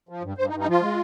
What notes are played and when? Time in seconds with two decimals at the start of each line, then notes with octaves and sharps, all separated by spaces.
0.09 F3
0.23 G2
0.37 G2 C5
0.49 D#4
0.53 G2
0.60 D#4
0.67 F3 F4
0.82 G#3